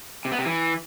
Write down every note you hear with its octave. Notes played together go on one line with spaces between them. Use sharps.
C3
B3
C3
E3